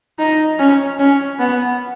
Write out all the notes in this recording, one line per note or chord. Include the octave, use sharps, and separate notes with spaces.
D#4
C#4
C#4
B3